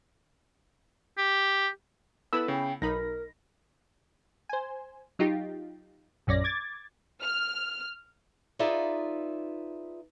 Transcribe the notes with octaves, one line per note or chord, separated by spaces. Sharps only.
G4
B3 E4 A4 B4 B5 E6
C#3 G5
B1 D#4 A#4 B5 A#6
C5 G#5
F#3 D#4 F4 G4
A#1 F#2 C#4 D5 A#6
D6 G#6 A6
F6
D#4 F4 G#4 B4 D5 E5